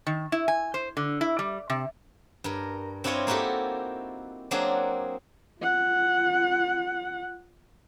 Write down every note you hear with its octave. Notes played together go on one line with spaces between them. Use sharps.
D#3
E4
G#5
C5
D3
E4
G3
C3
G2 A#4
C4 D4 E4 F4 C#5 D#5
A#3 D#4 E4 F#4 G4 A4
F#3 A#3 C4 D4 F#4 G#4
F4 F#5